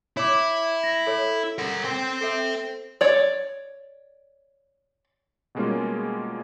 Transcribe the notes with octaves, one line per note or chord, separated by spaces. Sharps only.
E4 C#5 D6
A#6
A4 C#5
A#4 F#5
C5 G5
A4 E5
C#5 D5
B2 G3 G#3 A#3 C#4 F4